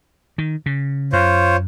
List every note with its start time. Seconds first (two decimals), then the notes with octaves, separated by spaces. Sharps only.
0.38 D#3
0.66 C#3
1.13 F#2 F4 C5 C#5